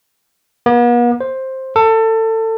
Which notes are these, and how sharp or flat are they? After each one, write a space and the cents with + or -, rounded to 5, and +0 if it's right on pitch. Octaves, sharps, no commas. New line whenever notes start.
B3 -45
C5 +10
A4 +25